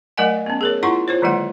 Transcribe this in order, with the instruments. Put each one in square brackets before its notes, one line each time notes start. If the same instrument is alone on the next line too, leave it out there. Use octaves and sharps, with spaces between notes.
[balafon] F#3 A3 A#4 D#5 F#5 G#5
B3 C#4
G#4 A#4 C#5
D4 E4 F4 F#5 C6 C#6
F4 C5 C#5
D3 D#3 F#3 G#3 A#3 F#5